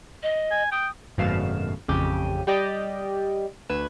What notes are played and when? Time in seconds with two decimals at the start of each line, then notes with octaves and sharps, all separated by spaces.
0.23 D#5
0.51 G#5
0.72 G5 D#6
1.18 G#1 F#2 B2 A3 F5 E7
1.88 A1 F2 C#3 G4 D#7
2.47 G3 G4 D5 D#5 G5
3.69 D2 B4 G#6 E7